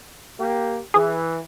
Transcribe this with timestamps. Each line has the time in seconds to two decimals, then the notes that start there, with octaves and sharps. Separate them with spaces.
0.38 A#3 G4
0.94 E3 G#4